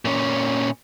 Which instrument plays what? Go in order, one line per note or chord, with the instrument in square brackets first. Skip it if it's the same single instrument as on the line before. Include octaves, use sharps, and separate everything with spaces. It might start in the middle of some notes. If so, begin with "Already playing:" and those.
[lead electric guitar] A#2 C#4